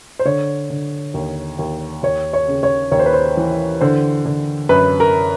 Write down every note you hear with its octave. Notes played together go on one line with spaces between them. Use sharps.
C5
D3 C#5
D3
D#2
D#2
D#2 C#5
C#5
C#3
C#5
D#2 C#5
C5
B4
C5
E3
D3 C5
D3
F#2 B4
A#4